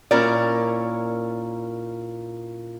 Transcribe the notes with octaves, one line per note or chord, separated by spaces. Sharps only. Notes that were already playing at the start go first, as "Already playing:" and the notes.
A#2 C#4 E4 A#4 D5